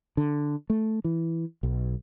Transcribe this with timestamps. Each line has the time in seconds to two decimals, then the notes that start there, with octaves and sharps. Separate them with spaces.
0.17 D3
0.70 A3
1.04 E3
1.63 B1